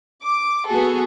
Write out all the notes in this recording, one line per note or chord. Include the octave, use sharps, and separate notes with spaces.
D6
B3 F#4 G#4 A4